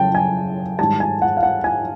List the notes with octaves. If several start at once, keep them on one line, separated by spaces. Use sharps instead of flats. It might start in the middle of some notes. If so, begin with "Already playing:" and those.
Already playing: F#2 C#3 G5 A5
G#5
G#2 D#3 G3 A5
G#5
F#5
F5
F#5
G#5